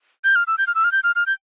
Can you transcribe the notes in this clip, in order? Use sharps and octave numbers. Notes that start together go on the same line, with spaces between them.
G6
F6
E6
G6
F6
E6
F6
G6
F6
F6
G6